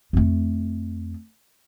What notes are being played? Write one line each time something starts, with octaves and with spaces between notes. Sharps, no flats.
F2 A3